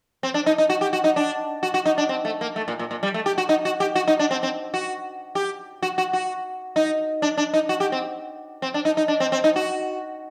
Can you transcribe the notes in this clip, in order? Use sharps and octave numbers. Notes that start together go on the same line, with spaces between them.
C4
D4
D#4
D#4
F#4
G4
F#4
D#4
D4
F#4
F#4
D#4
D4
C4
A3
A#3
A3
A#2
A#2
A#2
G3
A3
G4
F#4
D#4
F#4
G4
F#4
D#4
D4
C4
C4
F#4
G4
F#4
F#4
F#4
D#4
D4
D4
D#4
F#4
G4
C4
C4
D4
D#4
D#4
D4
C4
C4
D#4
F#4